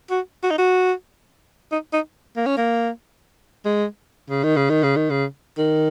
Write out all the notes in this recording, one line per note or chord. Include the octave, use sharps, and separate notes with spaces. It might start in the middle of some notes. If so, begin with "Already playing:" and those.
F#4
F#4
D#4
F#4
D#4
D#4
A#3
C#4
A#3
G#3
C#3
D#3
C#3
D#3
C#3
D#3
C#3
D#3